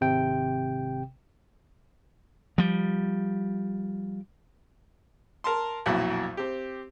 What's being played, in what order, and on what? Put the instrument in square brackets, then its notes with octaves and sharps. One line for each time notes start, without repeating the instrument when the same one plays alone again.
[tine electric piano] G#1 C3 G5
[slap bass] F3 G3
[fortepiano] A#4 A5 C6
B1 F2 A#2 E4 F#4
C4 G4